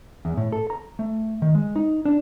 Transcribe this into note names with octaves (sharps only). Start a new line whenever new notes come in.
E2
A2
A4
A#5
A3
D#3
G#3
D#4
D4